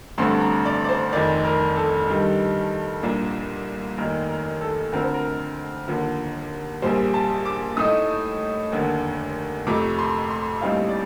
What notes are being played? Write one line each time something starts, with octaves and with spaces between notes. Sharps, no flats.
A1 G2 D3 A3 C4 C6
A#5
D5
D5
C5
F1 F2 D#3 D5
A#4
A4
G2 D#3 G3
C2 A#2 F3 A#3 D4
F1 D#2 D#3 A#4
A#4
A4
D2 D3 F3 C4 A#4
C5
A#4
D#2 D3 F3
A#1 A#2 G3 C5
A5
D6
A2 A3 D#4 D#6
F1 D#2 D3
F2 C3 F3 A3 D6
C6
C6
A#1 A2 G3 C4 D#4 F5
D5